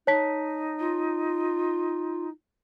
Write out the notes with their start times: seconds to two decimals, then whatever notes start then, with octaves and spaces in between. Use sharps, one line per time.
0.07 D#4 C#5 A5 B6
0.80 F4